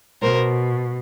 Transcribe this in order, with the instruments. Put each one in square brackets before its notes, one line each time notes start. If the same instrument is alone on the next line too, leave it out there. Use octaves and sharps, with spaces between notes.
[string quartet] B2 A#4 C5